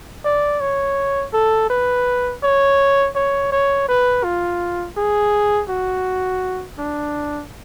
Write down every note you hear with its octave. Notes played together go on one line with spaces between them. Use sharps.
D5
C#5
A4
B4
C#5
C#5
C#5
B4
F4
G#4
F#4
D4